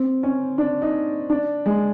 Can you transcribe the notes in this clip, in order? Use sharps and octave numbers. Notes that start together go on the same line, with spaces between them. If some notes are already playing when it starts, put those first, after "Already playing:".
Already playing: C4
C#4
D4
D#4
D4
G#3